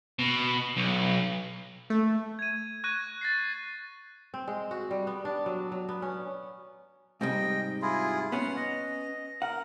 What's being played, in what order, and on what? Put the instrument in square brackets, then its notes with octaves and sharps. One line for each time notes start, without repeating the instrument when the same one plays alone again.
[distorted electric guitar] B2
B1
[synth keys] A3
[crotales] G#6 D#7
C#6 F#6 G#6 A#6 D#7
A6 A#6 C7
[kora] C4
G#3
F#4
G3
B3
D4
F#3
F#3
B3
C#4
[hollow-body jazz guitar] G#2 C3 G3 [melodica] D#5 G5
[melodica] E4 F4 G#4
[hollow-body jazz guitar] B3 C#4 [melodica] F#5
[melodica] D#5
[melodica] A#4 [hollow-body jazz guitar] F#5